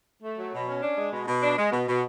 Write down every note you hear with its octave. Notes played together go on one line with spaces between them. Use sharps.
A3
F#3
B2
C#4
D4
G#3
B2
B2
D4
G#3
B2
B2